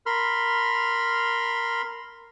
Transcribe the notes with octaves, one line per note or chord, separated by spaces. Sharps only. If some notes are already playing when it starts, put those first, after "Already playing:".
A#4 B5 C6 F6